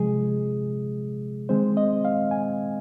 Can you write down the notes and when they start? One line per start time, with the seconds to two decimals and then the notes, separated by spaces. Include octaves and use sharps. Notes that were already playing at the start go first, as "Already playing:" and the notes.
Already playing: C3 F3 G#3 G#4
1.49 D#3 G#3 C4 C5
1.77 D#5
2.05 F5
2.31 G#5